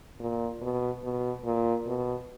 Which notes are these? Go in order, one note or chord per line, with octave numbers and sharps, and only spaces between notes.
A#2
B2
B2
A#2
B2